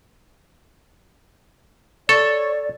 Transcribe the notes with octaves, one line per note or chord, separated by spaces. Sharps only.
A4 C#5 D5